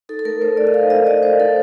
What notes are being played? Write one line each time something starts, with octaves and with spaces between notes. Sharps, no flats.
D#4 A4
A4
A3 A#4
A3 C5
D#4 D5
D#5
A3 F5
D#4 D#5
D#4 D5
A3 C5
A3 A4